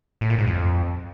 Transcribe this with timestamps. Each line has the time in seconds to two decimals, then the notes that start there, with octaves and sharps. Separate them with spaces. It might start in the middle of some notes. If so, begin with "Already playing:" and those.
0.21 A2
0.30 A#2
0.38 G#2
0.47 F2